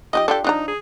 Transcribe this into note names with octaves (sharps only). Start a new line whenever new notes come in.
F3 D#4 G4 D#5
D4 F4 G4 A4
F3 D4 D#4 A#5
G#4